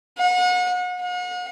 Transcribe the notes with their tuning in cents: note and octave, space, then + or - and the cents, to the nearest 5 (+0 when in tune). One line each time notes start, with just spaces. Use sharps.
F#5 -35
F#5 -45